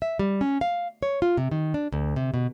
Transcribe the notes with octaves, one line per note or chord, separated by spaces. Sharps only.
E5
G3
C#4
F5
C#5
F4
C3
D#3
D4
D2
C3
B2